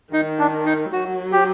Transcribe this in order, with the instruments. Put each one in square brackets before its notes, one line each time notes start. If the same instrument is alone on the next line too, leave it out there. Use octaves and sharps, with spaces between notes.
[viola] D#3 [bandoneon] D#4
[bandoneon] D4
D#4
[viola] F#3 [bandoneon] F#4
[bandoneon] G4